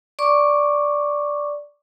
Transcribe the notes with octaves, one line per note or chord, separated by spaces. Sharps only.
D5 C#6 D6